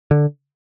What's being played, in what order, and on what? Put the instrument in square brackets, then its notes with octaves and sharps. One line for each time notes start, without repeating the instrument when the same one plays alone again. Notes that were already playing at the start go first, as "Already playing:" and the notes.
[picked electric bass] D3